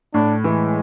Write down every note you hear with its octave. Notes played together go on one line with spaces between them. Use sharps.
A2 D4
E3 G#3